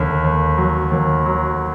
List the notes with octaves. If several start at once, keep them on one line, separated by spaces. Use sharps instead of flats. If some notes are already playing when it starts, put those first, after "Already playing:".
Already playing: D#2 D3
D#2
F#3
D#2
F#3